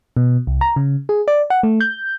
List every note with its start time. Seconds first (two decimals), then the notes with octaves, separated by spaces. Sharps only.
0.17 B2
0.47 C2
0.61 A#5
0.76 C#3
1.09 G#4
1.28 D5
1.50 F#5
1.63 A3
1.81 G6